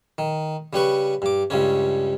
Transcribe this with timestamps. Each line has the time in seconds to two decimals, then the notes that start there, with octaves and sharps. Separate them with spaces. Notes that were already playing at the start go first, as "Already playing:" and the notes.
0.18 D#3
0.73 C#3 G3 B4 C#6
1.22 G2 D6
1.50 C#2 G2 C#3 C#4